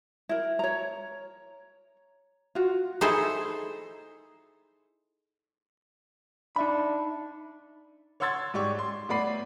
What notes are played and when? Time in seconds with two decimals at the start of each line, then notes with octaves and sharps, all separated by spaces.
0.29 E4 A#4
0.59 C#5 A#5
2.55 F4 F#4
3.01 D#4 E4 G#4 A4 C5 E5
6.56 D4 D#4 E5 B5
8.20 C#5 F#5 C6 E6 G#6 A6
8.54 G#2 G4 D5 C#6
8.79 C6
9.09 A2 B3 D5 B5 C7